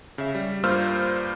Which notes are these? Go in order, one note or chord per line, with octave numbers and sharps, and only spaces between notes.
C#3 E5
G3
G2 A#3 F4 C5 E6 F6